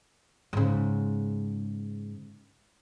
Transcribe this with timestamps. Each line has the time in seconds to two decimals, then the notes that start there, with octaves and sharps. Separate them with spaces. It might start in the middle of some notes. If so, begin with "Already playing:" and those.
0.53 G#2 C#3